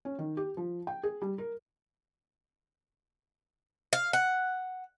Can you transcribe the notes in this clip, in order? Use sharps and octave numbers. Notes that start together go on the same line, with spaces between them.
C#4
D#3
G4
F3
G5
G#4
G3
A#4
F5
F#5